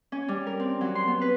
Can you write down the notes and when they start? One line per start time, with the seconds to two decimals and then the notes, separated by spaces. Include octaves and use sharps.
0.12 C#4
0.28 G3
0.47 A#4
0.60 C4
0.81 F#3
0.95 C6
1.08 B3
1.21 B4